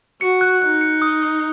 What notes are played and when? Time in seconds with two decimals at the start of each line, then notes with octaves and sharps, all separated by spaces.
0.21 F#4 C#7
0.41 F#6
0.62 D#4 F#6
0.81 C#7
1.02 D#6
1.23 D#6